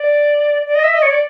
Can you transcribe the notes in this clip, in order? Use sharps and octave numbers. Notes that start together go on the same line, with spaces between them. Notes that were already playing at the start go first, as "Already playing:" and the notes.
Already playing: D5
D5
D#5
E5
D#5
C#5
D5